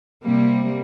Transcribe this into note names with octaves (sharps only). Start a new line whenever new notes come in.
C3 G3 A#3